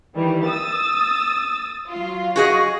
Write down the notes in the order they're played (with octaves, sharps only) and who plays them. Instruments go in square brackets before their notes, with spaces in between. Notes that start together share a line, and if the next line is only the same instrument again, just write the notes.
[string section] D#3 E3 G3
D#6 E6 A6
F#3 F4
[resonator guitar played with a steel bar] F#4 G#4 D#5